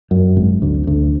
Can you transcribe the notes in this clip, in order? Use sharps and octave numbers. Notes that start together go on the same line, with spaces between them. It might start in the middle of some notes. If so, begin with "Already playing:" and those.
F#2
G#1
D2
D2